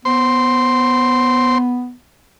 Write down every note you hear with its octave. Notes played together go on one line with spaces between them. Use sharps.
B3 C5 C6